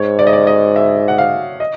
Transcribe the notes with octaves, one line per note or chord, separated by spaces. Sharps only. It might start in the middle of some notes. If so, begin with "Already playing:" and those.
Already playing: G#2 C#5
D5
D#5
D5
D#5
E5
F#5
F5
D#5